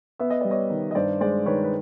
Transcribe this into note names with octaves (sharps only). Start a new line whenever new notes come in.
B3 E5
D#5
G3 D5
C#5 D#5
D#3
D#5
G2 C5 D5
G#3 C5 D5
D#3 B4 C#5
B4